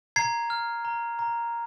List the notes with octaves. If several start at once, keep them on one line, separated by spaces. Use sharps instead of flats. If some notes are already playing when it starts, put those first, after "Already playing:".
A#5 G#6 C7
F6
A#5
A#5